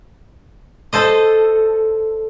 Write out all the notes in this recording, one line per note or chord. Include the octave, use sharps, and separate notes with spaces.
A4 C5 D#5